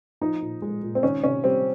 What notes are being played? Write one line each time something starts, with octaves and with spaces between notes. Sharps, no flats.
F3 D#4
A#2
G#3
A#2
C4
D#3 C#4
C3 C#4
G3 C4